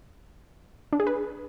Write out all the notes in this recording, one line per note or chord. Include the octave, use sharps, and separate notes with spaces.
D4
G#4
B4